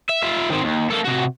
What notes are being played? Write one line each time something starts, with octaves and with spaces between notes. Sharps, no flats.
E5
F4 E5
D#3 C4
D#2
A#3 A4
C3 F#4